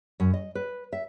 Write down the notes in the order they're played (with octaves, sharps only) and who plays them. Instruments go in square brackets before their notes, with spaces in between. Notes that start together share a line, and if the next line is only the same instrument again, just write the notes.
[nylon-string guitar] F#2
D#5
B4
E5